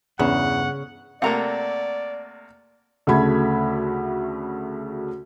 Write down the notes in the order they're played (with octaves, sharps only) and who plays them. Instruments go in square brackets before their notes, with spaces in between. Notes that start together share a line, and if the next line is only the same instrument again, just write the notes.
[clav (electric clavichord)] E2 [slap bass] G2 B3 D4 [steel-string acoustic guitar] C#3 [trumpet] F#5
[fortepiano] C3 A3 A#3 [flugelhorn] D5 [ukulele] F#5 A#5
[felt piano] D2 C#3 A3 F#4 B5 G#6